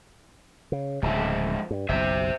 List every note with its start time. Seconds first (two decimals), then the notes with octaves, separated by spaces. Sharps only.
0.72 C#3
1.03 D1 G#2 C#3 F3 E5
1.71 G2
1.89 F#1 B1 C5 E5